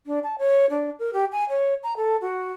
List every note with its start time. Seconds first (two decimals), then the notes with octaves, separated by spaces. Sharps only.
0.06 D4
0.23 A5
0.39 C#5
0.70 D4
0.99 A#4
1.13 G4
1.32 G#5
1.49 C#5
1.83 A#5
1.97 A4
2.21 F#4